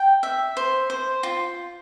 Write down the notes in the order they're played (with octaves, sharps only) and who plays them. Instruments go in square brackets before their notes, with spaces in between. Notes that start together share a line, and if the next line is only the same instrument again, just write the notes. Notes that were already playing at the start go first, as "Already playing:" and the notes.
Already playing: [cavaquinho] G5
E5
C5
C5
F4